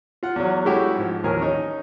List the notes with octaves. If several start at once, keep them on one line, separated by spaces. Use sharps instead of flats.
F4 F#5
E2 F#3
G#3 A3 C#4 E4 F#4 G4
G#2 F3
A1 D#2 F3 C#4 A#4 G#5
C#4 D#4